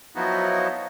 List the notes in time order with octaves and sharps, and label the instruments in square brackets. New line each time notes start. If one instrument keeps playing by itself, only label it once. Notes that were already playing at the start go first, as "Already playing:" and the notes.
[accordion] F3 F#3 B3 D#4 E4 F#4